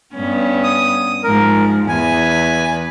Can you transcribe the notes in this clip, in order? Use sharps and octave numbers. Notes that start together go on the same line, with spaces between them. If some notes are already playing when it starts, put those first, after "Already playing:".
G2 B3 C#4
D#6
G#2 F3 A#4
E2 B4 G#5